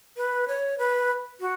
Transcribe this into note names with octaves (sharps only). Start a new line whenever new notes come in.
B4
C#5
B4
F#4